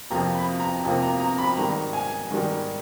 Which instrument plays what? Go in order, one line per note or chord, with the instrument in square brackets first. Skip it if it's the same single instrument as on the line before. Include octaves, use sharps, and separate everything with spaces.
[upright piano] F2 C3 F3 A#3 A#5
B5
A#5
F2 C3 F3 A#3
A#5
A#5
B5
G#2 D#3 G3 A#5
G#5
G#2 D#3 G3